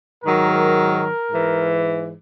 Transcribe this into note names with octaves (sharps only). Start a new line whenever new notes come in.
G#2 D#3 F#3 A#4
G#2 E3